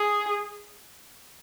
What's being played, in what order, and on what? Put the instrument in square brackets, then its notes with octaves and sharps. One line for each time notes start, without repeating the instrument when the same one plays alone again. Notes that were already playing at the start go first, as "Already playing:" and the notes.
Already playing: [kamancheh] G#4